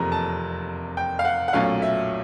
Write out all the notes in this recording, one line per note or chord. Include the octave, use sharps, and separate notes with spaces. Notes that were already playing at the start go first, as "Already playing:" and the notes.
Already playing: F1 E2 C3 F3 A#3 A#5
A5
G5
F5
F#5
F#5
B1 A#2 F#3 A3 C#4 F5
E5